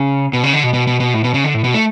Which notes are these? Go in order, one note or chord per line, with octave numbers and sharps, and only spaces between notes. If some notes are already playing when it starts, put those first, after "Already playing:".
Already playing: C#3
B2
C#3
D3
B2
B2
B2
B2
A2
B2
C#3
D3
A2
B2
A3